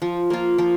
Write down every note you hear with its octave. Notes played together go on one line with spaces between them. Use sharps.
F3
A#3 F4
F3